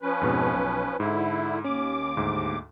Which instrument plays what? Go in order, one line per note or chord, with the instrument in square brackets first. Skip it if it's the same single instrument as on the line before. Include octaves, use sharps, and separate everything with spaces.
[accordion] F3 C#4 B4
[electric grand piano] F2 G#2 B2
B1
[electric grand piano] G#2 [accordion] D3 E4
[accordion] D#2 D6 [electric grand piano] C#4
[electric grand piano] D2 G#2